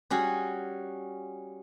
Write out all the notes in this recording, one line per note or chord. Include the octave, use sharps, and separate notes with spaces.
G3 C#4 F#4 G#4